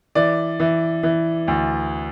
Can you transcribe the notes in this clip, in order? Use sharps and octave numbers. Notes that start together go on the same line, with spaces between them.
E3 D5
E3
E3
D2